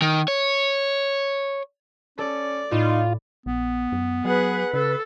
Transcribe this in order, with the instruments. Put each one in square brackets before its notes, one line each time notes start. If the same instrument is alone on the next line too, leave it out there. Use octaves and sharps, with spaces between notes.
[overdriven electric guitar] D#3
C#5
[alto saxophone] C#4 [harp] A4 [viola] D5
[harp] A2 E7 [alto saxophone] D#4 [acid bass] F4
[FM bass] A#1 [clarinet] B3
[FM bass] F#2
[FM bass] F#3 [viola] G#4 F#5 [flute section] B4
[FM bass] C#3 [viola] A4